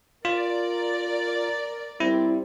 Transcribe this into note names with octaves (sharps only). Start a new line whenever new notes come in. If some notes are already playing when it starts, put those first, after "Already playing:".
F4 A#4 D5
G3 C4 E4